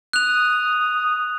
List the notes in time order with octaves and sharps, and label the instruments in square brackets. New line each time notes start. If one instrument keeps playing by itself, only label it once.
[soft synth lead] D#6 [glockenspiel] F#6 F7